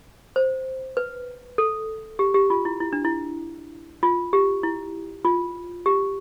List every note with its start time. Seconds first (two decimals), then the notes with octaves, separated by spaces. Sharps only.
0.36 C5
0.97 B4
1.58 A4
2.19 G4
2.34 G4
2.50 F4
2.65 E4
2.80 E4
2.93 D4
3.05 E4
4.03 F4
4.33 G4
4.63 E4
5.25 F4
5.86 G4